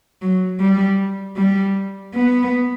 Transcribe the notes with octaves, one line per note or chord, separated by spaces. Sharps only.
F#3
G3
G3
B3